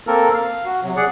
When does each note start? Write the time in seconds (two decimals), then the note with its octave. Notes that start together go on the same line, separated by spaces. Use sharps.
0.07 A#3 C4 A4 A#4
0.34 F5
0.65 F#4
0.83 C3 F#3
0.96 G#4 D5 F#5